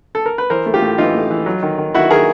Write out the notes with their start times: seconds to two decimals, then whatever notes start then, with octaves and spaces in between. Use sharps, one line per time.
0.15 A4
0.26 A#4
0.38 B4
0.50 E3 A#4 C5
0.66 A3
0.74 F4 G4
0.82 A2
0.98 E3 D#4 F4
1.15 A2
1.30 E3
1.46 F#3
1.63 D#3
1.78 D#3
1.95 D#3 E4 F#4
2.10 D#3 G#4 A#4